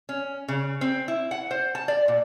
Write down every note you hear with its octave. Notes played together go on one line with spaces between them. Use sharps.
C#4
C#3
C4
E4
F#5
C5
A5
D5
A#2